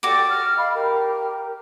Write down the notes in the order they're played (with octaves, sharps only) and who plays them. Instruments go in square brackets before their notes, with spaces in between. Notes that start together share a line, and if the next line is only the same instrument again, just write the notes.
[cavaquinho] F#4 D6 [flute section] G4 A4 D5
[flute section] F6
D#5 F5 B5
G4 A#4